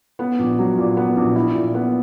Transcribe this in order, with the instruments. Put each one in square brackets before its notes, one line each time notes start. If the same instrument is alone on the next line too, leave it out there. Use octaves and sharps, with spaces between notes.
[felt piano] B3
A#1
F#3
A#2
B3
A#1
E4
A#2
B3